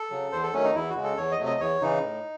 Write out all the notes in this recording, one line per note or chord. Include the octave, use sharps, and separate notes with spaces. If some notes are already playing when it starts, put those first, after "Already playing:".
Already playing: A4
C#3 F#3
E2 C5
A4
D#3 F#3 A3 C#4
D#4
E2 E4
F#4
C#3 G#3
A4
E2 C#5
D#5
C3 F#3 A3
D#5
E2 C#5
C#3 E3 D#4
A2